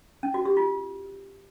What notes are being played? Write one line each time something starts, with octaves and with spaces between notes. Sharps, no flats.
C#4
F#4
G4
F4